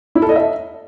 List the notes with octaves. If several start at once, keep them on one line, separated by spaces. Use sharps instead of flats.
E4
A4
D#5
E5